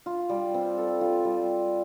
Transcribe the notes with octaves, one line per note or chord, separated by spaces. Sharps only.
F4
G3
C4
A4
F4
G3